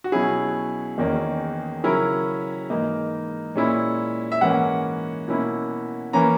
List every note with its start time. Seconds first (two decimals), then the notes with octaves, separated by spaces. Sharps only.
0.04 F#4
0.12 B2 F#3 C#4 E4 G#4
0.98 E2 D#3 A#3 C#4
1.84 C#3 F#3 C#4 E4 A#4
2.70 G#2 E3 A#3 D#4
3.55 A#2 G#3 C#4 E4
4.32 E5
4.41 G#2 E3 A#3 C#4 F#5
5.28 B2 A#3 C#4 E4
6.13 E3 A#3 C#4 A#5